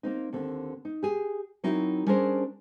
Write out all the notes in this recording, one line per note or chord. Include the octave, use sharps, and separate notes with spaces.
A#3 C4 D#4
D#2 D3 C4
D#4
G4 G#4
F#3 C4 D#4 E4 F#4 A#4
G3 C#4 D4 G#4 A#4 C5